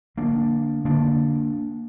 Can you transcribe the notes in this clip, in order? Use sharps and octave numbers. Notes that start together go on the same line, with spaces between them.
D3 A#3 D4
D3 A#3 D4